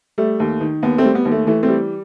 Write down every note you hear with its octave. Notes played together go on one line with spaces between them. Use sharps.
G3 A3
D#2
D#3
D#2 B3
A3 C4
G3
B3
D#2
A3
E3 A3
A3 C4
G3